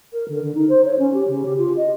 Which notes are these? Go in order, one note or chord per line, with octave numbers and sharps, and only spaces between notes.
A#4
D3
D3
D#4
C5
C#5
C#4
G4
C#3
G4
F4
D#5